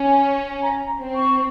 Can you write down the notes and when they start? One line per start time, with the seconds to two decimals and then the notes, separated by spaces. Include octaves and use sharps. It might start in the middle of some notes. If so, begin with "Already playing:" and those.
Already playing: C#4 G#5
0.62 A#5
1.01 C4
1.15 C#6